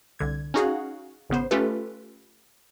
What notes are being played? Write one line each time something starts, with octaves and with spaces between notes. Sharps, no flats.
C2 D3 G#6
C#4 D#4 F#4 G#4 F5 F#5
G#1 C#3 B3 C5
A3 C#4 F4 G4 A4 B4